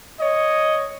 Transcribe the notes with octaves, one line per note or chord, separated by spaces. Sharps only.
C#5 D#5